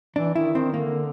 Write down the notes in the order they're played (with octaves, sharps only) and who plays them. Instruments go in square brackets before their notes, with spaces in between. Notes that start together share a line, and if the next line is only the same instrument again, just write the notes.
[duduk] E3 [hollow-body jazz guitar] D4
[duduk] D#3 [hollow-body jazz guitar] E4
[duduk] D#3 [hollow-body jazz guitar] C4
[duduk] D3 [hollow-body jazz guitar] A#3